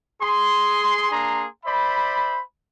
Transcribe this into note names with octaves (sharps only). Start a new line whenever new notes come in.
G#4 C6
A#3 D4 G#4 A#5 C6
C5 D5 E5 B5